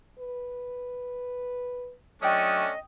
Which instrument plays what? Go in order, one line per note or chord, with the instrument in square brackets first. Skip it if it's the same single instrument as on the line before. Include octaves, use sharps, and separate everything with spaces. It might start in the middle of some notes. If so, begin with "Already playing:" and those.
[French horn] B4
[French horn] F#3 [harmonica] A3 C#4 D4 [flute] D#5 [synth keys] G5 D#6